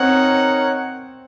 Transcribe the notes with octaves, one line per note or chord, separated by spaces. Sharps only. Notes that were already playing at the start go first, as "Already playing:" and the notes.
Already playing: C4 D#4 A#4 C#5 F#5